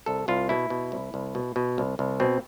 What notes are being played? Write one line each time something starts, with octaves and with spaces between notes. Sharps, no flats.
C2 A4
C2 F4
B2 E4
B2
C2
C2
B2
B2
C2
C2
B2 C4